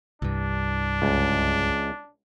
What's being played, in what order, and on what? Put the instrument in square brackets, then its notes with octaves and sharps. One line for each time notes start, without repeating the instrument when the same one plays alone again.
[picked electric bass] C2 G2 [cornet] D4
[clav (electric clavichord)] C#2